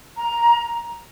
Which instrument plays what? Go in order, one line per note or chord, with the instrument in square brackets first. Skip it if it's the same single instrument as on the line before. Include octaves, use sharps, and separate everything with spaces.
[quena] A#5